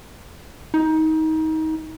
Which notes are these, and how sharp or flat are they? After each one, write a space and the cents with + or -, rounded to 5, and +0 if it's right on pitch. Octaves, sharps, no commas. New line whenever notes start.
D#4 +25